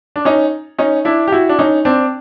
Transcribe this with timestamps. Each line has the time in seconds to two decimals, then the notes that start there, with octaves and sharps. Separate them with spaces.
0.16 D4
0.25 C#4 D#4
0.78 C#4 D#4
1.05 D4 E4
1.27 G4
1.32 E4 F#4
1.49 D4
1.59 C#4 D#4
1.85 C4 D4